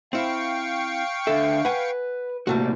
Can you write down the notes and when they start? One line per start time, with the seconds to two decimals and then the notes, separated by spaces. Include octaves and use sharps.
0.13 C4 E4 F5 G5 C#6
1.27 D3 A4 E5
1.65 B4 F#5 G#5
2.47 A2 C3 G3 A3 A#3 F#4